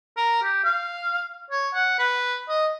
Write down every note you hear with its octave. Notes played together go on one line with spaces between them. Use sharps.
A#4
G4
F5
C#5
F#5
B4
D#5